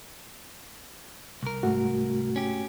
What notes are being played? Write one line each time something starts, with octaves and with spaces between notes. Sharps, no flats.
C2 A#4
G#2 A3 F#4
C#4 G4